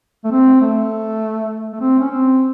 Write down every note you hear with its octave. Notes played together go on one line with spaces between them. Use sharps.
A3
C4
A3
A3
C4
C#4
C4